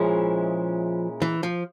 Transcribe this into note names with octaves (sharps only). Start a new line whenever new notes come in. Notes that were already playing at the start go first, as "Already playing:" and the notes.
Already playing: A#2 F3 G#3 C#4 E4
E3
F3